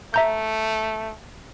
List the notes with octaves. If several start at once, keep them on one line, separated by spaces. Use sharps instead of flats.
A3 E5 A#5 G6